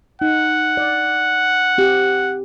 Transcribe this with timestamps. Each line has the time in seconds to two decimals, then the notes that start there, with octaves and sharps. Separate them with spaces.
0.21 D#4 F#5
0.77 D5
1.78 C4 G4